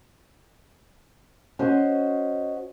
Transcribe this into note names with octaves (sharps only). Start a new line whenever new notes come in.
C#4 F#4 C5 D#5